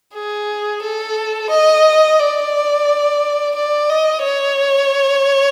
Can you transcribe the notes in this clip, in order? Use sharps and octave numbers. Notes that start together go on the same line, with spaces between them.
G#4
A4
D#5
D5
D5
D#5
C#5